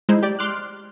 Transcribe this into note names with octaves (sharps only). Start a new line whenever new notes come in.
G#3 D#4 E4 C5
G4 D5
C6 D6 F6 F#6